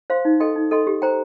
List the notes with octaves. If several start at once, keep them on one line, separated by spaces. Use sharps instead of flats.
C5 F5 C6
D#4
A4 D#5 G5 C6
D#4
A4 D#5 G5 C6
G4
C5 G5 A#5